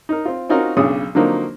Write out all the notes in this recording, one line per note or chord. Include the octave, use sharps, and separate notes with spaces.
D#4 A#4
C4 F4
C4 C#4 D#4 F4 F#4 A#4
B1 C#3 D4 G#4 C#5 D#6
D3 F3 F#3 A#3 C4 D#4